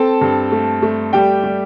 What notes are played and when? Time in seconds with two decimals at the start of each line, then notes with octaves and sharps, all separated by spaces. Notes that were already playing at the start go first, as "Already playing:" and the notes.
Already playing: C4 A4 A5
0.21 G2
0.52 A3
0.82 A3
1.13 G3 G4 G5
1.44 G3